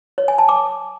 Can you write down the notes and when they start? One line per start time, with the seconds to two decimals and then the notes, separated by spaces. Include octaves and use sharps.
0.18 C#5
0.28 G#5
0.38 A5
0.49 D6